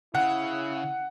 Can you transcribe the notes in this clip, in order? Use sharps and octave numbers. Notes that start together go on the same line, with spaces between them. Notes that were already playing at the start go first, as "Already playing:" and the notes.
C#3 E4 F#5